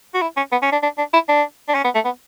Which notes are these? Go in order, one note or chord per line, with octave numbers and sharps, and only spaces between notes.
F#4
E4
C#4
B3
C#4
D4
D4
D4
E4
D4
D4
C#4
B3
A3
B3